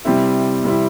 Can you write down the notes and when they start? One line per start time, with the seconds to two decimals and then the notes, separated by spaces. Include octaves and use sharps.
0.05 C3 G3 C4 E4
0.64 C3 G3 C4 E4